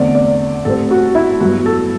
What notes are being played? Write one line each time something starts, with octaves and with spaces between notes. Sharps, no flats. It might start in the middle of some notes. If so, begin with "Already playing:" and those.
Already playing: E2 D3 A3 C4 D5
D5
A2 G3 C4 A4
F#4
E4
G2 F#3 B3 F#4
A4